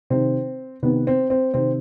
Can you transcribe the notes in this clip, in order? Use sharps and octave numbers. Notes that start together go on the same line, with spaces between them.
C3 D#3 C4
C3 D#3 B3
C4
C4
C3 D#3 C4